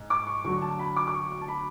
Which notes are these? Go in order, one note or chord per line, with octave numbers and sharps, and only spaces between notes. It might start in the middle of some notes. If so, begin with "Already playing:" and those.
Already playing: G#2
D6
C#6
D2 D3 F#3 C#6
A5
B5
D6
D6
C#6
C#6
A5
B5